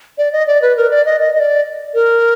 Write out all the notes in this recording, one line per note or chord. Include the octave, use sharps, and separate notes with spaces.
D5
D#5
D5
B4
A#4
D5
D#5
D#5
D#5
D5
A#4